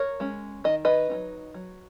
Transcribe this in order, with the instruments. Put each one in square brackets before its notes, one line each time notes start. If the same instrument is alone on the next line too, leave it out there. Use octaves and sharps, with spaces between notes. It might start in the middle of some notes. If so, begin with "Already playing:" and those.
Already playing: [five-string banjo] A#4 C#5
G#3 C#4
D#3 D#5
B4 D#5
F#3 B3 D#4
F#3